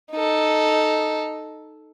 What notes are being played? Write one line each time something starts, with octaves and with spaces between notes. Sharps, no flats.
D#4 A4